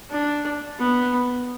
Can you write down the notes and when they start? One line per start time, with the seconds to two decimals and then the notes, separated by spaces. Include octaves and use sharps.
0.10 D4
0.78 B3